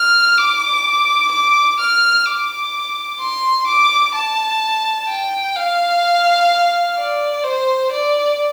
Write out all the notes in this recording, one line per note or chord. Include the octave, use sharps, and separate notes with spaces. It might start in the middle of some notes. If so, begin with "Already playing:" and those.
Already playing: F6
D6
D6
F6
D6
C6
D6
A5
G5
F5
D5
C5
D5